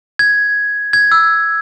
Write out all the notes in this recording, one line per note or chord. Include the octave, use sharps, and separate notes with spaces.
G#6
G#6
E6